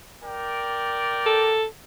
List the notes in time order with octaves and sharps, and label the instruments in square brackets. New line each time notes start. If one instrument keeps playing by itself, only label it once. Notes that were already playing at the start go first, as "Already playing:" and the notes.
[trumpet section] A#4 D5 G5
[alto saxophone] A4